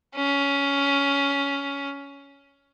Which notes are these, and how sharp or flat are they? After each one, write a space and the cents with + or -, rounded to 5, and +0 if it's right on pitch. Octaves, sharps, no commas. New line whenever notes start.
C#4 +15